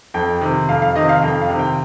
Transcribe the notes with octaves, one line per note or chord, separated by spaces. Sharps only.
F2 G5
C3 D#3
F2 F5
F5
C3 D#3 D#5
F5
F2 G5
F5
C3 D#3
G5